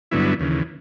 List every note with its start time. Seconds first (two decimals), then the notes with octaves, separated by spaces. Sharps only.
0.11 G2 D3 F#3 B3 E4
0.40 D#2 C#3 E3